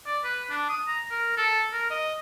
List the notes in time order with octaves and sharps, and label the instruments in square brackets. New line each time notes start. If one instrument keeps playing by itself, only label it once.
[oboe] D5
B4
D4
D#6
A#5
A#4
A4
A#4
D#5